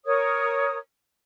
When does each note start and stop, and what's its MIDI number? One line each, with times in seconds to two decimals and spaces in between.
0.05 0.77 70
0.05 0.77 73
0.05 0.77 87